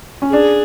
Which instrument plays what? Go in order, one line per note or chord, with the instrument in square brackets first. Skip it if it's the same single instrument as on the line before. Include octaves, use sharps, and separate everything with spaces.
[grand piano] C#4
[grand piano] D4 [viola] G#4